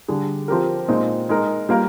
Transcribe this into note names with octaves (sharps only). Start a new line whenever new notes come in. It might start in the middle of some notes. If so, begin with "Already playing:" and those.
D3 G3 D4 G#4
F3 C4 G4 A#4
A#2 G#3 C4 D#4
G#3 D#4 A#4
G3 A#3 F4 A#4